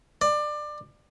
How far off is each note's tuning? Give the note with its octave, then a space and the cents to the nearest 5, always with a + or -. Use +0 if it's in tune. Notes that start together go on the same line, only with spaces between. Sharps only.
D5 +25